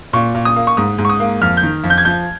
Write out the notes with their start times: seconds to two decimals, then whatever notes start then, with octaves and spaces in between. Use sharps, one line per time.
0.13 A#2 C#6
0.35 A#2
0.45 D#6
0.56 A#3
0.67 C#6
0.77 G#2 D#6
0.98 G#2
1.05 C#6
1.09 D#6
1.20 A#3
1.41 F2 F6
1.57 G6
1.63 D#3
1.84 F2
1.90 G6
1.98 G#6
2.05 F3 G6